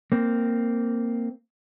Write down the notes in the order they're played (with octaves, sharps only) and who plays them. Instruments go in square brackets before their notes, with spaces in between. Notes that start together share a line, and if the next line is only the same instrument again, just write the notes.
[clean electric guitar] A#3 C4